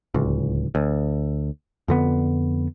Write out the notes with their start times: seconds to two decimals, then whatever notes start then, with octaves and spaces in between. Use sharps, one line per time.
0.14 D1 C#2
0.75 D2
1.88 F2 D3 B3